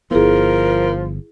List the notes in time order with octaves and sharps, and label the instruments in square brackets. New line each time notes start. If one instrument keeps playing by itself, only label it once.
[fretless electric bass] G1 B3 [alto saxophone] F3 [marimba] E4 G#4 [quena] A#4